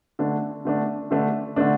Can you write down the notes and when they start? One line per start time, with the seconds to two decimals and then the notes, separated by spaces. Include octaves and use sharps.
0.19 D3 A3 D4
0.65 D3 A3 D4
1.11 D3 A3 D4
1.56 D3 A3 D4